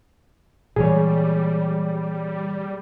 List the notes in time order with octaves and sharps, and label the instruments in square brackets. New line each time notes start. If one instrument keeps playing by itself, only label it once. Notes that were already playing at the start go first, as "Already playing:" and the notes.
[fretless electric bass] A#2 E3 G#3 [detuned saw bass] G3 [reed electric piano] G#4 C#5